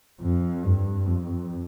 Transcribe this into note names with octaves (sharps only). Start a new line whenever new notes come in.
F2
G2
F2